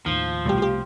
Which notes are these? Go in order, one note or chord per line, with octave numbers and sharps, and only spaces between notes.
D#2 A2 D#3 F3
C2 B2 G3 A3 G4
F4 G4